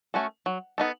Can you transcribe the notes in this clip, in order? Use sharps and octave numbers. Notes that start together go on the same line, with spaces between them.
A3 C#4 F#4 A4
F#3
B3 D#4 A4